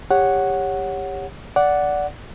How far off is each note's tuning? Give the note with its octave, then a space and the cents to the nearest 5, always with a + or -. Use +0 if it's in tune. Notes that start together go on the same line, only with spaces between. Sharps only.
G4 +20 C#5 +0 F#5 +0
D5 -10 F#5 +0